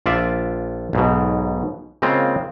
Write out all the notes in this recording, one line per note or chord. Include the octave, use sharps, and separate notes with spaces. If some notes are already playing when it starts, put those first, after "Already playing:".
A#1 F4 D5 E5
B1 G#2 B2
C#3 G#3 A#3 C4 F4